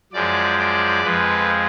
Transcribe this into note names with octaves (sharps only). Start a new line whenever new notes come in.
F#2 F3 G#3 D5
D5
F2 F3 G#3 B4